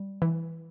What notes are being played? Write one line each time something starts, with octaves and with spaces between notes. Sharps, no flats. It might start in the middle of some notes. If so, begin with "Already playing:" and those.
Already playing: G3
E3